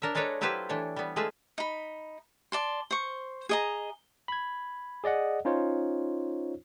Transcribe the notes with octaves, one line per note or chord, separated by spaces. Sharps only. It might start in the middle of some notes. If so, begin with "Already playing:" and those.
D4 A#4 C#5 E5
G#3 D4 A4 B4 C#5 A#5
F#3 E4 F4 G4 B4 C5
E3 A3 D4 C#5
G3 B3
G#3 A3 F4 G#4 B4 E5
D#4 B5
D5 A5 C6
C5 C#6
G#4 D#5 A#5
B5 G#6
G#4 D5 D#5 F#5
C#4 D#4 F4 C5 C#5